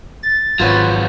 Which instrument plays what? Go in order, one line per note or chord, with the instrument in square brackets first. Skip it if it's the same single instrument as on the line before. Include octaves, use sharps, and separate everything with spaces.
[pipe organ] A6
[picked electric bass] G#1 [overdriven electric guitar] F3 F#3 [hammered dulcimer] F4 B4 C#5